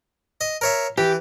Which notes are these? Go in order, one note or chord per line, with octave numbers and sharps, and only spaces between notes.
D#5
A#4 C#5 E5
E3 G4